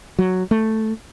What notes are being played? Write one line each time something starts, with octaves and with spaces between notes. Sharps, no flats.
F#3
A3